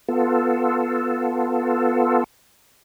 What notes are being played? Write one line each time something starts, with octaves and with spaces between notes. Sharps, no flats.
B3 F4 A4